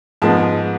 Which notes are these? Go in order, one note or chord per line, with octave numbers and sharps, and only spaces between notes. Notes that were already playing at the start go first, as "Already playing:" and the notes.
G#2 F3 G#3 B3 A5